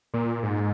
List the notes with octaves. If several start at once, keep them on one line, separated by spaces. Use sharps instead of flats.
A#2
G#2